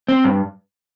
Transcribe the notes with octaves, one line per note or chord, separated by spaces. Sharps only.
C4
G2